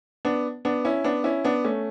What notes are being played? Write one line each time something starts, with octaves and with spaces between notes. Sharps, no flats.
B3 D4
B3 D4
C#4 E4
B3 D4
C#4 E4
B3 D4
A3 C#4